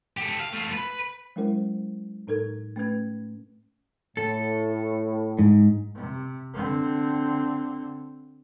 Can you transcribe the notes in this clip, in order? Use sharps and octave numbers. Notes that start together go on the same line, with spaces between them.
G4 A4
F5
A3 F4
B4
F#3 G#3 C#4 E4 A#4 C5
A2 D#4 A4 A#4 G#6
A3 C#4 B4 G#6
A2 A4
G#2
C3
D3 C4